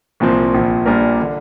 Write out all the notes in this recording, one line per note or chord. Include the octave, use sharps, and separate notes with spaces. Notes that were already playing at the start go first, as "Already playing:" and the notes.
C2 A#2 F3 C4
A#1 A#2 F3
A#1 A#2 G3 D4 A#4
D3